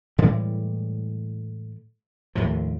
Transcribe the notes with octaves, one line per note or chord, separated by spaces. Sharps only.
A2 E3 G3 G#3
D#2 A2 C3 F3